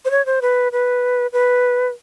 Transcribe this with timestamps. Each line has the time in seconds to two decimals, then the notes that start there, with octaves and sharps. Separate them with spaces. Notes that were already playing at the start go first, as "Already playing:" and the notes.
0.05 C5
0.11 C#5
0.26 C5
0.42 B4
0.72 B4
1.33 B4